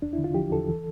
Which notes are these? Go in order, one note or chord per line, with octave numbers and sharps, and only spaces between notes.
E2 D4
E4
D3
F4
F3 G4
E2 A4
E3